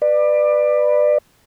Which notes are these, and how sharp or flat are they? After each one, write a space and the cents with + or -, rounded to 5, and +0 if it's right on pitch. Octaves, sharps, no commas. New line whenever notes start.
B4 +0 D5 +25